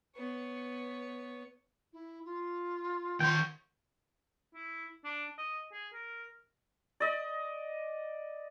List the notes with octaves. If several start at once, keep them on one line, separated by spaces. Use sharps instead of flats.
B3 C#5
E4
F4
D#3 C#5 G5 C6
E4
D4
D#5
G#4
A#4
D5 D#5